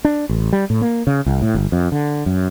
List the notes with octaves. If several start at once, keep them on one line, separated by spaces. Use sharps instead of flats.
D4
A1
G3
A2
A#3
C#3
C2
A2
G1
F2
D3
F#2